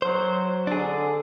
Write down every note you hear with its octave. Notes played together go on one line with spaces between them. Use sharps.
F#3 C5
D3 D4 G#4